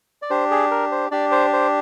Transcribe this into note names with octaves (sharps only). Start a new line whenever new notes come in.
D5
D4 G4 C5
G#4
A#4
C5
D4 G4 D5
C5
C5